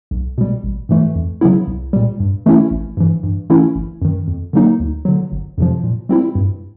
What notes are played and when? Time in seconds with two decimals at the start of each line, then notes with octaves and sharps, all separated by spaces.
0.11 B1
0.38 B2 G3
0.63 A1
0.89 G#2 E3 A3
1.15 F2
1.41 C#3 F#3 B3 E4
1.67 C2
1.93 A#2 G3
2.20 G2
2.46 E3 A3 C#4 E4
2.71 G#1
2.97 G2 E3
3.23 G2
3.50 E3 A3 C#4 E4
3.75 G1
4.02 F#2 D#3
4.28 F2
4.53 D3 F#3 A#3 D#4
4.80 D2
5.05 D3 F#3
5.32 G1
5.58 F2 C3 F3
5.84 A#2
6.09 G3 C4 E4
6.35 G2